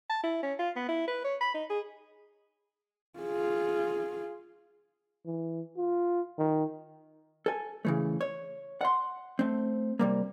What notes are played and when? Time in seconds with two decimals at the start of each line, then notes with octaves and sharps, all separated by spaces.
0.10 A5
0.23 E4
0.43 C#4
0.59 F4
0.76 B3
0.88 E4
1.07 B4
1.24 C#5
1.41 B5
1.54 D#4
1.70 G#4
3.20 F4 G#4
5.26 E3
5.77 F4
6.38 D#3
7.46 A4 G#5
7.85 C#3 E3 A3
8.21 C#5
8.81 F#5 C6
9.39 A3 C4
9.99 C3 G3 A#3